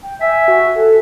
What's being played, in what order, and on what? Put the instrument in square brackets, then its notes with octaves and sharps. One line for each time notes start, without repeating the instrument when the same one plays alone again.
[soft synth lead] G5
[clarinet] E5 [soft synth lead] G#5
[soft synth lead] F#4
A4